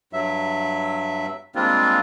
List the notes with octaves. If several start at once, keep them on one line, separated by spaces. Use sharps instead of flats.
G2 F#3 E5
G3 G#3 A#3 C4 D4 F4